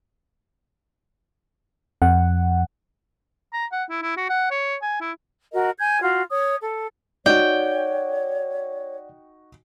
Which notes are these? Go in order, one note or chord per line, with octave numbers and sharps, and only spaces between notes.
F2 F#5
A#5
F#5
E4
E4
F#4
F#5
C#5
G#5
E4
F#4 A#4 D#5
G#5 G6 G#6
F4 F#4
C#5 D#6
A4
D#4 F#4 C#5 D5 F#5 G5